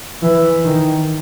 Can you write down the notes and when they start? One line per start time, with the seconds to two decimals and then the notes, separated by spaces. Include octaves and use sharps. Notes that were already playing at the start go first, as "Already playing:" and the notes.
0.22 E3
0.65 D#3